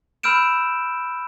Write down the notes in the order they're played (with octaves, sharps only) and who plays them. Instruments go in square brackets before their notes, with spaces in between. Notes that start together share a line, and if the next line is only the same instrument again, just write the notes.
[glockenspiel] B5 E6 F6 G6 D7 E7